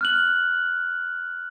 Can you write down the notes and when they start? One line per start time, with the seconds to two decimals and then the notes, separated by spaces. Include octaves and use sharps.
0.01 F6 F#6 F#7